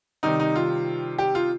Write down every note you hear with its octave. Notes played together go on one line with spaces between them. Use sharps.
C3 D#3 G3 D#4
D#4
F4
G4
F4